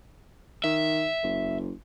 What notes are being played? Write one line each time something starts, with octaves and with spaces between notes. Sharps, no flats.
D#3 E5
F#1